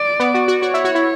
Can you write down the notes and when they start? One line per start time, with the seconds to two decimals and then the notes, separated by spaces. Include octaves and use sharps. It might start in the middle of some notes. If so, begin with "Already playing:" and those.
Already playing: D5
0.20 B3
0.34 F#4
0.48 F#4
0.62 F#4 C#5
0.74 E4
0.85 F#4
0.95 E4